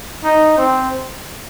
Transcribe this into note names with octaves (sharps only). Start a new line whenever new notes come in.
D#4
C4